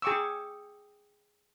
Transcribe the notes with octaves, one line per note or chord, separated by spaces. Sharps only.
G#4 G5 C#6 D6 E6